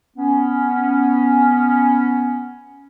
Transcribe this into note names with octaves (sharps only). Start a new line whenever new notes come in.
B3 C#4